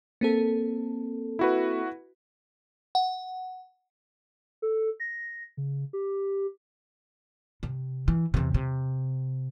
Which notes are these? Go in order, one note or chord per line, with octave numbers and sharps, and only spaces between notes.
A#3 C4 A4
E4 F#4 B4
F#5
A4
A#6
C#3
G4
C3
E3
E2 C3
C3